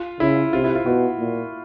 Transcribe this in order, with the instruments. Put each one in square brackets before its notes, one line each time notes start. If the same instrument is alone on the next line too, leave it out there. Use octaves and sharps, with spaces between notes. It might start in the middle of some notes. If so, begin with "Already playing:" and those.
Already playing: [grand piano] F4
[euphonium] C#3 [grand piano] E4
[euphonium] C3 [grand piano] F4
[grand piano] E4
F4
[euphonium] B2 [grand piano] F#4
[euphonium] A#2